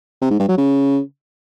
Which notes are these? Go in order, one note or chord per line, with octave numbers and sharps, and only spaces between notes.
C3
G#2
G2
F#3
C#3